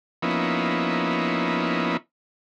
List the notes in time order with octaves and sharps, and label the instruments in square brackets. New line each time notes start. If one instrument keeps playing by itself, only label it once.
[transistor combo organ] F3 A#3 B3 C#4 D#4 E4